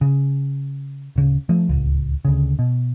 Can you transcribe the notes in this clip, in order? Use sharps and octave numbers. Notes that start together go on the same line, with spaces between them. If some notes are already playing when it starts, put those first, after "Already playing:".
C#3
D1 C#3
F3 A3
D1 G#1 C#2
D2 C#3
B2